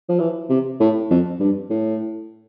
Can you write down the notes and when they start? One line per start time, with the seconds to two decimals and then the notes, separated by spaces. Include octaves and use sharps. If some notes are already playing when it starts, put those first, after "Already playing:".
0.09 F3
0.19 E3
0.49 C3
0.80 A2
1.10 F2
1.40 G2
1.70 A2